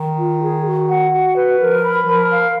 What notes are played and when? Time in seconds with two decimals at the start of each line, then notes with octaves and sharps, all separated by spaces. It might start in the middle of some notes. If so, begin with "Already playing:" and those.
Already playing: D#3
0.17 F4
0.41 G#4
0.65 F#4
0.88 F#5
1.11 F#4
1.35 B4
1.59 F3 A#4
1.83 B5
2.05 F3 A#4
2.29 F5